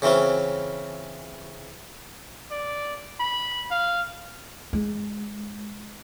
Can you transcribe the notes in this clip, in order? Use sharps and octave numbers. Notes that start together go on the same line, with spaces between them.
C#3 E3 C4 C#4 F4
D5
B5
F5
G#3